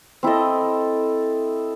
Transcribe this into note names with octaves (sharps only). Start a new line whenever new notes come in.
C4 E4 A4 D#5